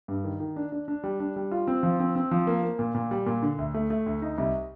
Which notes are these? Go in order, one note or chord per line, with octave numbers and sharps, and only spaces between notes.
G2
D#3
D#3
D4
D4
D4
G3
D4
G3
F4
C4
F3
C4
C4
F3
A#3
A#3
A#2
A#2
G3
A#2
D3
D2
A3
A3
D2
D#4
C2